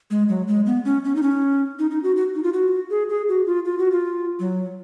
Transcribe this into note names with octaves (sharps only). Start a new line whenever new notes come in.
G#3
F#3
G#3
B3
C#4
C#4
D#4
C#4
D#4
D#4
F#4
F#4
D#4
F4
F#4
G#4
G#4
F#4
F4
F4
F#4
F4
F#3